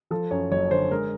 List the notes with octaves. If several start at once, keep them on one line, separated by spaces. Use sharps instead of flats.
F3 A4
F#2 C#5
F#1 C#5
D3 C5
G#3 A#4